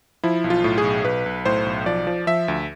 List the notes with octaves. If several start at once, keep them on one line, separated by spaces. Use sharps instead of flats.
F3 E4
B1
F4
A2
G#4
B1
B1 B4
B1
A2 C5
B1
F3 D5
F3
F3 E5
D2